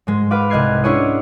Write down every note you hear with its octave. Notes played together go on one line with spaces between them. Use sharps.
G#2 G#3
B4 F5 F#5 D6
C2 D#5 F#6 G#6 C7
C#4 D4 E4 G#4 C#5 D#5